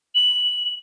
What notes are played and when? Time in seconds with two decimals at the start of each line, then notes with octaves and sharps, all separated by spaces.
0.15 F#7